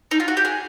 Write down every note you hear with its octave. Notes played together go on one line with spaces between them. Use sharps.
D#4
F4
F#4
G4
G#4